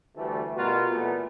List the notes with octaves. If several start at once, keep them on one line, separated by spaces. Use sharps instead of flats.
D2 E3 G3 A3
B2 G3 F4 F#4 A#4 B4
A#2 E3 A3 B3